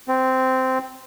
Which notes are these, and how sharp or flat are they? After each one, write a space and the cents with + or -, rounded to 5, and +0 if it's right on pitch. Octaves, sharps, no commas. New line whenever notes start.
C4 -10